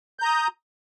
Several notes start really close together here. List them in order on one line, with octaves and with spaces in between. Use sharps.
G6 A#5 D#6